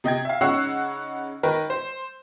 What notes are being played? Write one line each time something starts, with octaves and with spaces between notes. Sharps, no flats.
C3 D#5 G5 G#6
E5 F5
C#3 D#4 C#5 F#5 E6 C7
D#3 A#4 B4
C5